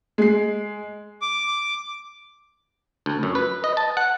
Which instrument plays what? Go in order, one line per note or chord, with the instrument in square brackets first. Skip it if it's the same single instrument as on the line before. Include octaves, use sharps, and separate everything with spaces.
[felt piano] G#3 C7
[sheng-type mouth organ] D6
[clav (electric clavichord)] D2
F#2
B4
D#5
A5
F#5